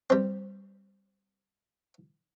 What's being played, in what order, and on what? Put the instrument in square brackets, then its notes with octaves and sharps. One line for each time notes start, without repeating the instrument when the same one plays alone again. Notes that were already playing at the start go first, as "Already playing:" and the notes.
[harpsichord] G3 C4